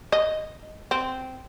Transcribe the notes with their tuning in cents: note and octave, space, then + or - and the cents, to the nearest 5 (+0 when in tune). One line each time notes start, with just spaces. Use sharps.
D#5 +0
C4 -10